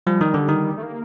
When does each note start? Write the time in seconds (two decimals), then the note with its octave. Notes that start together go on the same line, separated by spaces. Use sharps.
0.06 F3 G3
0.21 D#3
0.34 D3
0.48 D#3
0.77 A3
0.83 A#3